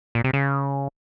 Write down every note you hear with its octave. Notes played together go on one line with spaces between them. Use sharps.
A#2
C3
C#3